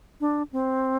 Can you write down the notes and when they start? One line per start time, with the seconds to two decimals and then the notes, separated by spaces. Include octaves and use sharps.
0.20 D4
0.53 C4